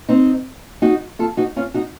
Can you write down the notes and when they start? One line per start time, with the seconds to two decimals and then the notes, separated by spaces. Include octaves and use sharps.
0.09 C4 D#4
0.82 D#4 F#4
1.19 F4 A4
1.37 D#4 F#4
1.56 C#4 F4
1.74 D#4 F#4